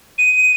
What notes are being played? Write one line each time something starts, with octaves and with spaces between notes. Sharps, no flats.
D#7